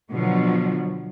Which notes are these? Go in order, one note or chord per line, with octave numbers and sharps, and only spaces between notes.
B2 D3 F3 F#3